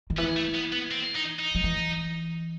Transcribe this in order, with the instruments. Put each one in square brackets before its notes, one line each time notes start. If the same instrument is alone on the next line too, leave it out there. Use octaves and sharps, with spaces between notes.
[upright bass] D#3
[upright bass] E3 [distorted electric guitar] B3
[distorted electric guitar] A3
B3
B3
C4
D#4
D#4
[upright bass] F#3
E3